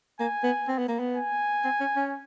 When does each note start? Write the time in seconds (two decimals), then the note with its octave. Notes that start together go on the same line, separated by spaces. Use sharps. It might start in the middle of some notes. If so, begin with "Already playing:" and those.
0.20 A#3 G#5
0.44 B3
0.68 C4
0.78 B3
0.88 A#3
1.00 B3
1.16 G#5
1.64 C4
1.80 C#4
1.96 C#4